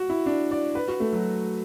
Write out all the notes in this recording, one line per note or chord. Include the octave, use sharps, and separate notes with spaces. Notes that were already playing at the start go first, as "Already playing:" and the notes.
Already playing: F#4
E4
D4
D5
B4
F#4
A3
F#3